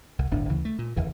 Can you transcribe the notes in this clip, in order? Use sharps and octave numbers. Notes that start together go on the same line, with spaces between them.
C2
D1 G1 A2 D4
D2 C#3 E3
A3
A#2
F1 D#2 C#3 E3